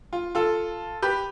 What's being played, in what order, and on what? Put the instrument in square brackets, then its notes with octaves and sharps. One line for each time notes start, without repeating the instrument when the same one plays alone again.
[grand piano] F4
F4 A4
G4 B4